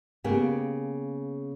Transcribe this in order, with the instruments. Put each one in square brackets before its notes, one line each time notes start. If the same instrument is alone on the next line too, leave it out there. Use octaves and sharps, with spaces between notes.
[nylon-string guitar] C#3 A#3 B3 G4